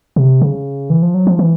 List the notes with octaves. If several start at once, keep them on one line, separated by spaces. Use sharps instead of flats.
C3
C#3
E3
F3
F#3
F3
E3